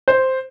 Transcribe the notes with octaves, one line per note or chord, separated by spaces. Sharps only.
C5